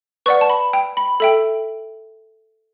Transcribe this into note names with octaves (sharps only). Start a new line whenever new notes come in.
B4 D5 F#5 C#6
A5
B5
G5
B5
A4 E5 G5